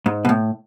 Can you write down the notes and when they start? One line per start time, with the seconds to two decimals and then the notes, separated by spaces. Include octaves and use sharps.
0.06 G#2
0.25 B2
0.29 A2